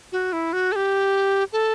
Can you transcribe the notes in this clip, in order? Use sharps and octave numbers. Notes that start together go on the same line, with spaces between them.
F#4
E4
F#4
A4
G4
A4